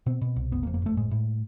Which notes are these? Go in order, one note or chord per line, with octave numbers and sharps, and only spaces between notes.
B2 C4
B2
C2
F#1 B3
A#3
F2
A#3
F#1 A3
A2 G#3
A2